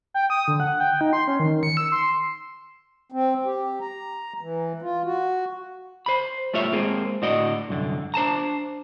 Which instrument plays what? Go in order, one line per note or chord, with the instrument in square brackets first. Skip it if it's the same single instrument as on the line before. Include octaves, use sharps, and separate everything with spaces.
[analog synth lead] G5
D#6
D3
F#5
G5
D#4
C6
C#4
D#3
C#7
E6
C6
[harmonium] C4
G4
A#5
E3
F4
F#4
[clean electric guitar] C5 B5
G3 A3 F4 C#5 E5
G#3 A#3 C4 G#4
A2 D3 F#4 D5 D#5
C2 F#2 D3
D4 C5 A5 A#5